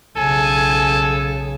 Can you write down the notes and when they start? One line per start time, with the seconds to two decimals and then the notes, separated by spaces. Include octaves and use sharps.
0.17 B1 C#3 A4 G#5